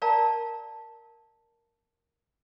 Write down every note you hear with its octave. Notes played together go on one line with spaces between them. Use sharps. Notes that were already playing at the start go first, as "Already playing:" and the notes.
A#4 D5 F5 A5 A#5